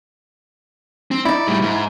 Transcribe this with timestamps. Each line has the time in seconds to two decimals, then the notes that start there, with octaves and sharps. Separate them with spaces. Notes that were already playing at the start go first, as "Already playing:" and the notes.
1.11 C4
1.25 D#4 E4 D5
1.48 A2 G3
1.62 G#2